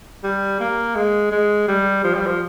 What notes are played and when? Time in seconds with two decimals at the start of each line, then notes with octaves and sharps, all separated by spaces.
0.24 G3
0.60 A#3
0.96 G#3
1.32 G#3
1.68 G3
2.04 F3
2.15 G3
2.26 F3